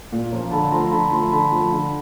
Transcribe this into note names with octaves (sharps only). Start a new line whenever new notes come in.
A#2
F3 A#3 C#4 F4
D3 A5 B5
F3 A3 A#5 C6
D3 A5 B5
B5
F3 A3 A#5 C6
D3 A5 B5
F3 A3
D3